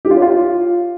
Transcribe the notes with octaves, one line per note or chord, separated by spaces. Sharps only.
G4
F4
C#5
F4